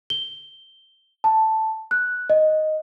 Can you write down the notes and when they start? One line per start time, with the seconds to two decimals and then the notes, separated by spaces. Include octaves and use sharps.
0.10 G7
1.24 A5
1.91 F#6
2.30 D#5